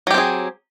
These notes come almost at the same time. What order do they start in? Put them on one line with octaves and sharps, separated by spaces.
F#3 G4 C4 G#4